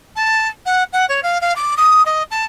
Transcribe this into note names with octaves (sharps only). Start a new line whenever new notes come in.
A5
F#5
F#5
C#5
F5
F5
D6
D#6
D#5
A5